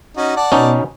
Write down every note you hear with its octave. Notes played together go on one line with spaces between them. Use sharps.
C#4 D#4 F#4
D5 F#5 A5
B2 C#4 D#4